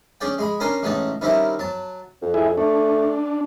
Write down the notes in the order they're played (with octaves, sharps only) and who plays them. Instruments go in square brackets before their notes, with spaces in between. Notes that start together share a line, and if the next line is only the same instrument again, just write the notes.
[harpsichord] C#4 G#4 D5 G5
G#3 G#4 B5
C#4 D4 A#4 G#5 A#5 C6
A1 G#3 C#4 D#4 A5
D#3 G3 C4 C#4 E4 A#4
F#3 A5
[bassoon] F2
[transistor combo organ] E4 G#4
[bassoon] A3 [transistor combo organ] D4